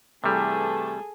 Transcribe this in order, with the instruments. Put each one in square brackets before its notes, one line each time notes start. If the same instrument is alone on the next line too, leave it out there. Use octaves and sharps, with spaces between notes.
[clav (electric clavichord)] C3 G3 [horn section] E3 A3 [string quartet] G#4 A4